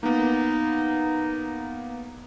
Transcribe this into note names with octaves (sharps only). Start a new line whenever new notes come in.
A#3 B3 D#4